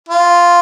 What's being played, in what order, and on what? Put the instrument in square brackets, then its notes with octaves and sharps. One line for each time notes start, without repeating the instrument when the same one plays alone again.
[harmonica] F4